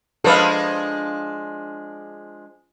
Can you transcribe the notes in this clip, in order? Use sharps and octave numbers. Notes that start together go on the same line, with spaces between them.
F3 G#3 D4 A4 B4 F5